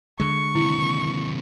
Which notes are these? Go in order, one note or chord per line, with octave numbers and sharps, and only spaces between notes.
D3 G#3 C#6
D#2 C3 E4